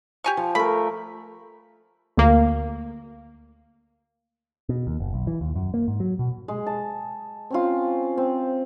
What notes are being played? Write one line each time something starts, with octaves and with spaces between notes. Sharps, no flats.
G4 G#5 C#6
F3
A3 A#4 B5
D2 A#3
B2
D#2
F#1
B1
E3
D#2
F#2
A#3
G#2
F#3
B2
G#3
A5
C4 C#4 F4
C4